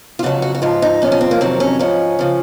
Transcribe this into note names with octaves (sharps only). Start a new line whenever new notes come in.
F4
F2 C#3 F#3 F#4
F#4
F#4
G#2 F3 F4
D#4
A#2 F3 C#4
C#4
C4
A#3
F2 C3 D#3 F#3 C4
C#4
G#2 F3 C#4
C#3 F3